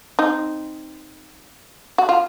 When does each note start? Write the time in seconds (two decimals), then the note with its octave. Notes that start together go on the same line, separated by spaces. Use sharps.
0.19 C4 D#4
1.98 F#4
2.09 F4